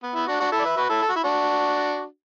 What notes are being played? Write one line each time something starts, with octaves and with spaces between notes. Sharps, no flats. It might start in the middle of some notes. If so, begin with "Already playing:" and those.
B3
B3 E4
D4 F#4
D4 F#4
E4 A4
D5
B4 E5
F#4 B4
E4 A4
A4
F#4
E4
D4 F#4